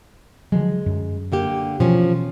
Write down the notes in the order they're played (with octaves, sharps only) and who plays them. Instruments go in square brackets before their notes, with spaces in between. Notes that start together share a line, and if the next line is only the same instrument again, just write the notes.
[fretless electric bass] D3 F3 F#3 [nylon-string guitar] G#3
[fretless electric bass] F#2
[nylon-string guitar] D3 A#3 G4
[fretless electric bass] B2 E3 [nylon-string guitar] F3 C#4